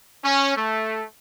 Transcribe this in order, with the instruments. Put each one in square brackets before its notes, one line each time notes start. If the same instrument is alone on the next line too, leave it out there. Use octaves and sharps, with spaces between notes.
[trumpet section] C#4
A3